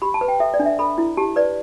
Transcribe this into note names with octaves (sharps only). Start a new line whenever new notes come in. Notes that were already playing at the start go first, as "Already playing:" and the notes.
G4 B5
A5
B4
G5
A4 E5
D5
D4
E5
A4 B5
E4
G4 A5
B4 D5